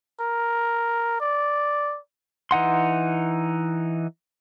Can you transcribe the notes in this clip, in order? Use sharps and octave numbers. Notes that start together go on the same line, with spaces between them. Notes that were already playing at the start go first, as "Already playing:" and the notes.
A#4
D5
E3 D#4 F#5 C6